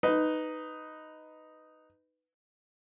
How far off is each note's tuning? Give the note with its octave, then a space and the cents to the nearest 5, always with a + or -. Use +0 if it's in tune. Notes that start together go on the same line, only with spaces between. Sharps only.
D#4 +0 B4 +10